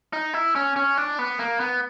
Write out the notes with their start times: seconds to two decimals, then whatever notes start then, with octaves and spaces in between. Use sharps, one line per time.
0.13 D#4
0.34 E4
0.56 C#4
0.76 C#4
0.97 D4
1.19 B3
1.39 A#3
1.60 B3